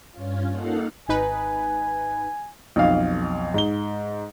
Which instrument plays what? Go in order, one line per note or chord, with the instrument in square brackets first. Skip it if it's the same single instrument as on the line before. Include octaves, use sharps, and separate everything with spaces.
[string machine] G2 C#4 F4
A#3 D#4 A4 F5 F#5
[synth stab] G#1 D#4 B4 [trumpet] G#5
[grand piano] B1 F2 F5
G#2 G7